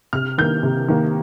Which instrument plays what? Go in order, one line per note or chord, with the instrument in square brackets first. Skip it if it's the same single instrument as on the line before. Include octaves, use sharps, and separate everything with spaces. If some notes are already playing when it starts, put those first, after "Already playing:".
[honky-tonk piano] C3 F6
D#3 A#3 G6
C3
D#3 A#3